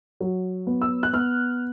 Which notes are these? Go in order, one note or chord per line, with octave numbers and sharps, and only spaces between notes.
F#3
B3
E6
F#6
B3 F6